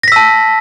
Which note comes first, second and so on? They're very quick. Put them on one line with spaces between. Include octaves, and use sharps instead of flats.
A#6 B6 E6 A5